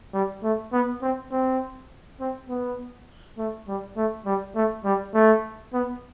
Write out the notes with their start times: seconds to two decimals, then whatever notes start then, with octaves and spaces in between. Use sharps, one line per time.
0.14 G3
0.43 A3
0.73 B3
1.02 C4
1.32 C4
2.20 C4
2.49 B3
3.38 A3
3.68 G3
3.97 A3
4.26 G3
4.56 A3
4.85 G3
5.14 A3
5.74 B3